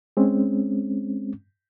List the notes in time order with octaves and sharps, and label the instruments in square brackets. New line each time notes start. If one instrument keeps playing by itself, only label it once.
[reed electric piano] G#3 C4 C#4